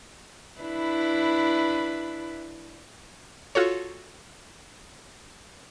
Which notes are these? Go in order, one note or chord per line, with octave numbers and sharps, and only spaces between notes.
D4 E4 B4
F4 F#4 A4 C#5